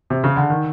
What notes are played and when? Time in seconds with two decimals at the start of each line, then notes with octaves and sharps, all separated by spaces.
0.10 C3
0.24 C#3
0.36 D3
0.50 D#3